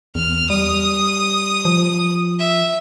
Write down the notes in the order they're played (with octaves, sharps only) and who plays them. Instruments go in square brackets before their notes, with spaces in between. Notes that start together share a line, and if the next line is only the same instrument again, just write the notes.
[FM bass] E2 [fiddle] F6
[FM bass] G3 [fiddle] D#6
[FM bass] F3
[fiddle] E5